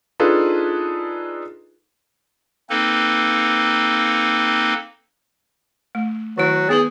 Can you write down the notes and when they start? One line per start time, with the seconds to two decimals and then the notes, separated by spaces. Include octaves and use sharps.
0.20 D4 D#4 F4 G#4 A4 B4
2.70 A#3 C4 D#4 A4 B4
5.95 A3
6.38 D#3 F#3 E4
6.69 B3 D#4 G#4 B4